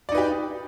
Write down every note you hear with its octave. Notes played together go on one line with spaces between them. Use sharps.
D#4 G4 B4 D5